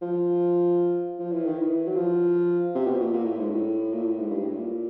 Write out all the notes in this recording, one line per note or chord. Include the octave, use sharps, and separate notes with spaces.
F3
F3
E3
D#3
E3
F#3
F3
C3
B2
A#2
A#2
A2
G#2
A2
A#2
A2
G#2
G2
A2
A#2